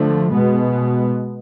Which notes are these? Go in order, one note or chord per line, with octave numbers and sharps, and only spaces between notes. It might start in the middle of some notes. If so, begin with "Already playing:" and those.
Already playing: D3 F3 A3
B2 G#3 B3